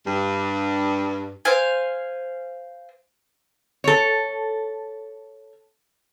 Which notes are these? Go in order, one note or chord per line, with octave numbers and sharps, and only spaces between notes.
G2
C5 F5 G#5
A4 C#5